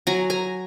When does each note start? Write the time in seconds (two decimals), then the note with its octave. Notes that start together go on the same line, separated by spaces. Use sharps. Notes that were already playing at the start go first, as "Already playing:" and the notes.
0.07 F#3 G#5 A#5
0.30 G#5 A#5